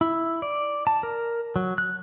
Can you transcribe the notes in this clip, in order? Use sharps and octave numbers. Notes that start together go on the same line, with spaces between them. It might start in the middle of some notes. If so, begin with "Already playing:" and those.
E4
D5
A5
A#4
F#3
F#6